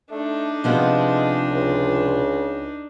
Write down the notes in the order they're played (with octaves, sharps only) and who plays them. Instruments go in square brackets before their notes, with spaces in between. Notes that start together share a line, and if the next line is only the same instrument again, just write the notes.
[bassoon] A3 [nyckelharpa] D4 D#4
[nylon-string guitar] C3 F3 B3 [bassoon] G#3
[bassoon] C#2